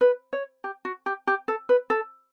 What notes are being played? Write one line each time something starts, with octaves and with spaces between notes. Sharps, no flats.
B4
C#5
G4
F#4
G4
G4
A4
B4
A4